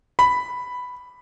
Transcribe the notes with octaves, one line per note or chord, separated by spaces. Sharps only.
B5